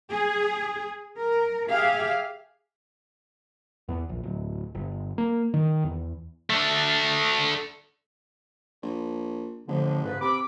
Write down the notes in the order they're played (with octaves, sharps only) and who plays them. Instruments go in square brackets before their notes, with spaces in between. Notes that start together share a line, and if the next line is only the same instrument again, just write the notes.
[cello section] G#4
A#4
G4 G#4 E5 F5
[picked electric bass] E2
A#1
D1
G1
A#3
D#3
E2
[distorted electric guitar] A3 D4
[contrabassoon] A#1
[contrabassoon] A1 [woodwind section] D3 F3
[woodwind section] G#2 C#3 B4
[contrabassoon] C3 [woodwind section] B5 D6